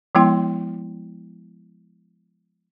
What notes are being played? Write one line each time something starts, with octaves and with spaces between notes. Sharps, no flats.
F3 G#3 B3 E4 G5 C6